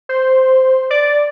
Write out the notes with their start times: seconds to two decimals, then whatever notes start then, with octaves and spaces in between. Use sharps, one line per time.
0.09 C5
0.90 D5